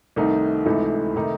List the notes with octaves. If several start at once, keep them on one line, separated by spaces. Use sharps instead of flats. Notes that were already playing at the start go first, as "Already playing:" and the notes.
C2 C3 D#3 A3 D#4
C#2 C3 E3 A3 D#4
C3 D#3 A3 D#4